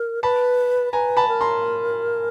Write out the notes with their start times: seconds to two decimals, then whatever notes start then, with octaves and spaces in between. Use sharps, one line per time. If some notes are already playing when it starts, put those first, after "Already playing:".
Already playing: A#4
0.23 B4 A5 B5
0.93 B4 G#5 A#5
1.17 A5 B5
1.28 A#4
1.41 A#5 C6